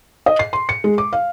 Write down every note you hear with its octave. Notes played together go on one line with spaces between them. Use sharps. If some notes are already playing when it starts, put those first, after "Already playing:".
D#5
C7
C6
C#7
G#3
D6
F5